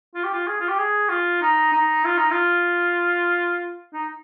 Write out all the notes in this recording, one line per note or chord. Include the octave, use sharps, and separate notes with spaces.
F4
G4
F4
G#4
F4
G4
G#4
F4
D#4
D#4
F4
D#4
F4
D#4